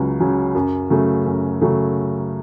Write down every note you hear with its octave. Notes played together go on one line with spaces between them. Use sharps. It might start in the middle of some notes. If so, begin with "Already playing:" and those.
Already playing: C#2 C#3 F#3
C#3 F#3
F#2
C#3 F#3 A3
F#2
C#3 F#3 A3